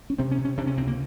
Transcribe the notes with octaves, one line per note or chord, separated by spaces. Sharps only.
C#4
C3 C4
C#4
C3
C#4
C3 D4
C#4
C#2 C4
A#3